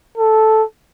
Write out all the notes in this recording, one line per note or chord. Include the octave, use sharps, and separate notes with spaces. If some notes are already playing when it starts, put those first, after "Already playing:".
A4